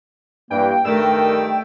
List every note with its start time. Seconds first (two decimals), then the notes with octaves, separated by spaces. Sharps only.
0.51 G2 E3 A#3 G5
0.85 G2 D#3 A3 A#4 E6